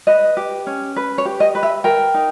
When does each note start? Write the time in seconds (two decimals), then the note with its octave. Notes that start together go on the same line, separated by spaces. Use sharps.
0.07 B4 D#5
0.37 G4
0.67 C#4
0.96 B4
1.18 C#5
1.25 G4
1.40 D#5
1.55 B4
1.63 E5
1.84 A#4 G5
2.14 D#4